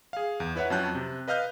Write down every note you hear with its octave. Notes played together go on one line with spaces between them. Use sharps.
G#4 F5
E2
E4 B4 C#5 E5 F#5
F2 F#3 C#4 A5 F#6 G6
C3
B4 D#5 F5 F6 G6